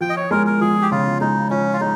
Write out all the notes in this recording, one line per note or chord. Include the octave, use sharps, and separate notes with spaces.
F3 G5
D#5
C#5
G#3 A#4
A#4
F3 G#4
G4
C#3 F4
G#3 D#4
F3 C#4
F4
G#3 D#4